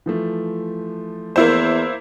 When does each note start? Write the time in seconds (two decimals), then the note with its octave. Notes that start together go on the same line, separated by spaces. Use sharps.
0.06 E3 F3 A3
1.36 E2 A#3 E4 C5